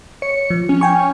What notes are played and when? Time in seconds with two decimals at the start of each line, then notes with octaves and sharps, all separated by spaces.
0.22 C#5 C#7
0.50 F3
0.69 C#4
0.81 G5 G#5 C#6